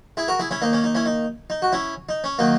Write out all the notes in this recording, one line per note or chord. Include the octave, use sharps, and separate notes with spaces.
E4 G#4
F#4 A#4
E4 G#4
C#4 E4
D#3 A#3 D#4
C#4
D#4
C#4 E4
D#4
D#4
F#4
C#4 E4
D#4
C#4
D#3 F#3 A#3 D#4